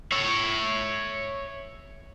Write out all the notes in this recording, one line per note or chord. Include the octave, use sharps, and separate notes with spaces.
C#5 E5